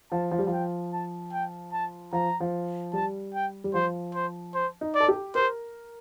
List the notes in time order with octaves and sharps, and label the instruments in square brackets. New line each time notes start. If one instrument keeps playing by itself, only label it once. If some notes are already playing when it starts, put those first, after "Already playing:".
[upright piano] F3 [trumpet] A5
[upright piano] F3
G3
F3
[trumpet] G5
A5
G5
A5
[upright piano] F3 [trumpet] A#5
[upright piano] F3
[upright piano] G3 [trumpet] A5
[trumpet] G5
[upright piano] G3
[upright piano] F3 [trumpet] C5
[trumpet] C5
C5
[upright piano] D#4
[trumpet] D5
[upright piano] A4
G4
[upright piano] A#4 [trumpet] C5